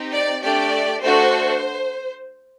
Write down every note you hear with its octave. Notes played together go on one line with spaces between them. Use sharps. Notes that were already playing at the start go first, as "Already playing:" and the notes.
Already playing: C4 D#4 G4
D5
A3 D4 G4 D5
A3 D4 F#4 A4 C5